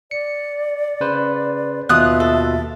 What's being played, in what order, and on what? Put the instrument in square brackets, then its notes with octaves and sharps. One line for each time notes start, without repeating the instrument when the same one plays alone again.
[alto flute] D5 [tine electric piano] C#7
[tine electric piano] C#3 B4 C5
[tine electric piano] D#2 B2 F4 [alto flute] E5 [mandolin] D#6 F#6
[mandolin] A4